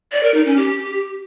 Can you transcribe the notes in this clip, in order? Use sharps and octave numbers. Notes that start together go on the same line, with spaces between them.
D5
A#4
D#4
C#4
G4